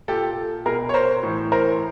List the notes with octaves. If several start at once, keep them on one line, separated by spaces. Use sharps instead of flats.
A#2 G4 A4
B2 G#4 A#4
C#5
A#4 C5
A2 E3
A#4 C5